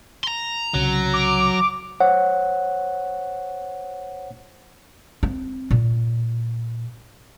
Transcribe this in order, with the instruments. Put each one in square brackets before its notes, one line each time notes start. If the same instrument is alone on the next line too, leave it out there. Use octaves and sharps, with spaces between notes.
[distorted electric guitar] A#5 C6
[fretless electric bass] C2 C#3 [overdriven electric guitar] F#3
[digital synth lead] D6
[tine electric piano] C5 C#5 F#5
[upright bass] C4
A#2